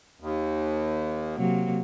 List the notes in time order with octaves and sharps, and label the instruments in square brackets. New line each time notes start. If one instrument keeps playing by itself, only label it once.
[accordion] D#2
[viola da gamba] C3 F#3 A#3